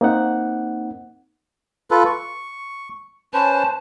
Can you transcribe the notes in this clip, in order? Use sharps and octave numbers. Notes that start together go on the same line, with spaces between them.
A#3 C4 D#4 F#5 F#6
F4 A4 B4
C#6
C#4 B4 C5 A5